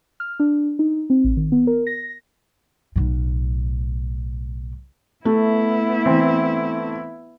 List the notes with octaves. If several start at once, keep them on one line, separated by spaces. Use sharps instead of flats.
F6
D4
D#4
C4
A1
D#3
B3
A#4
A#6
B1 A2
A3 B3 E4
E3 C4